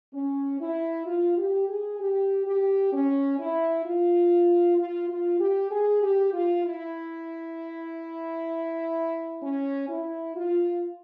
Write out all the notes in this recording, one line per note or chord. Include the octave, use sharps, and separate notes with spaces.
C#4
E4
F4
G4
G#4
G4
G4
C#4
E4
F4
F4
F4
G4
G#4
G4
F4
E4
C#4
E4
F4